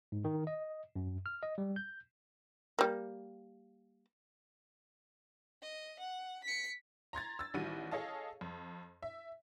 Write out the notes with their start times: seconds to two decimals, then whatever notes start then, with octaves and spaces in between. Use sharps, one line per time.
0.12 G#2
0.24 D#3
0.47 D#5
0.96 F#2
1.26 F6
1.43 D#5
1.58 G3
1.76 G6
2.79 G3 A#3
5.62 D#5
5.99 F#5
6.44 B6 C#7
7.13 A#5 C6 G#6 A6
7.39 E6 A6
7.54 A1 D#3 G3 F#4 D#7
7.91 G#4 A4 C#5 D#5 F5 A5
8.41 F2
9.03 E5